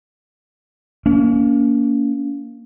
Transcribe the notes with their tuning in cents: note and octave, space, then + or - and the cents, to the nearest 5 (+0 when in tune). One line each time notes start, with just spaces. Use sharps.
A#3 +0 C#4 +40